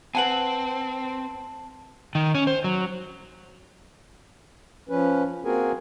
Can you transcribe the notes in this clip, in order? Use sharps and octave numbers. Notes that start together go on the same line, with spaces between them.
C4 B4 F#5 G#5 A5 F#7
D#3
C#4
C5
F#3
F3 C#4 B4
A#3 C4 F#4 G#4 A#4 G#5